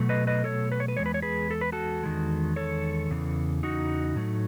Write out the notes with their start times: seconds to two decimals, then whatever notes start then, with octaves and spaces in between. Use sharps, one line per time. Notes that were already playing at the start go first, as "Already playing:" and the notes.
Already playing: B2 F#3 A3
0.09 B4 D#5
0.27 B4 D#5
0.44 A4 C#5
0.72 B4
0.80 C#5
0.88 B4
0.97 E2 D#3 G#3 C#5
1.06 B4
1.14 C#5
1.22 G#4 B4
1.51 A4
1.61 B4
1.72 F#4 A4
2.03 E2 D#3 G#3
2.56 A4 C#5
3.11 E2 C#3 E3
3.63 D#4 F#4
4.16 A2 F#3 A3